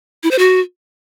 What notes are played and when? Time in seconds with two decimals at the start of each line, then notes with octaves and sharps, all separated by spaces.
0.23 E4
0.31 C5
0.39 F#4